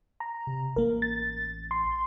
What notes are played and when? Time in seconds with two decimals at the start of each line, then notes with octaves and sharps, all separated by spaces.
0.20 A#5
0.47 C3
0.76 A1 A#3 A#4
1.02 A6
1.71 C6